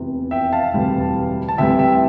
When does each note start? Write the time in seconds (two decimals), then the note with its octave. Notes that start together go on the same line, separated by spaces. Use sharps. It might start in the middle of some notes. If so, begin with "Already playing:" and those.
Already playing: F1 E2 C3
0.31 E5 G5
0.53 F5 A5
0.74 E1 D2 C3 E3 G3
1.48 A5
1.58 D2 C3 E3 G3 E5 G5
1.78 E5 G5